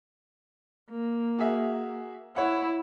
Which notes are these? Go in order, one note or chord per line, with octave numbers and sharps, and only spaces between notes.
A#3
F#4 G#4 E5
E4 C#5 F#5